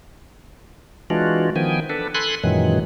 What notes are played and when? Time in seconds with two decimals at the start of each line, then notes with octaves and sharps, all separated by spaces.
1.10 E3 G#3 D4 F4 F#4
1.56 D#3 F3 B3 G5 G#5
1.90 D4 A4 B4
2.15 A4 G#5 B5 C6 F#6
2.44 F#2 A#2 D#3 E3 F#3 G#3